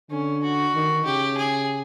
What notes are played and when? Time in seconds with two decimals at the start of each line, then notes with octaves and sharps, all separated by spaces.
0.11 D3 C#4
0.43 F#4
0.75 D#3
1.05 C#3 G4
1.37 G#4